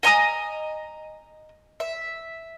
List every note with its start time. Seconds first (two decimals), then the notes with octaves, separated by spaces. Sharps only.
0.03 D#5 G#5 A#5 D#6
1.80 E5